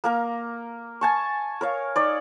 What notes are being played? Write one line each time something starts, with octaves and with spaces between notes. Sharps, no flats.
A#3 A#4 A#5
G#5 A5 C#6
A#4 C#5 F5
D#4 C#5 D5